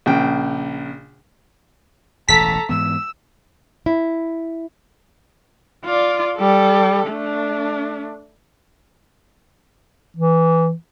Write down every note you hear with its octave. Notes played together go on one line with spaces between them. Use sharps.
A#1 C#3 G5
E1 A1 A4 A#5 B6
G#2 E3 B3 E6
E4
F4 D5
G3 A4
A3 D4
E3